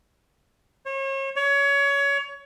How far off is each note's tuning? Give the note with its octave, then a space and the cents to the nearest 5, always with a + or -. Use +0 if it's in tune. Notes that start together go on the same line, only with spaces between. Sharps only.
C#5 -35
C#5 +25